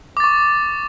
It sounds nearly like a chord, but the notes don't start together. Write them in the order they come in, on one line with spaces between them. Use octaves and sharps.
D6 A6 C#6